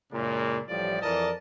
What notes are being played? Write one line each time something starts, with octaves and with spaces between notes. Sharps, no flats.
F#2 A#2 C#3 G#3 A#3 D4
A1 A2 F3 G3 D5
F2 E3 A#4 D5 D#5 A5